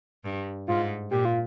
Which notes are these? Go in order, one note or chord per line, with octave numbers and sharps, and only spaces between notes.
G2
G#2 F4
A#2 G4
F4